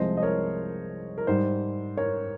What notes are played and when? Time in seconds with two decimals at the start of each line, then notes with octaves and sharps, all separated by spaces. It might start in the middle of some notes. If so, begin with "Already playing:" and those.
Already playing: C2 C3 F3 G#3 C5 D#5
0.17 D#5
0.23 A#4 C#5
1.18 A#4
1.27 G#2 G3 C5
1.97 A#4 C#5